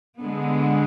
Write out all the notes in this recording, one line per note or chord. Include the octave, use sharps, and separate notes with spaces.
D3 G#3 B3